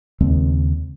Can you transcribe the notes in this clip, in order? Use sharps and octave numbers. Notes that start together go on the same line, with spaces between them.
D#2 C#3 G#3 C4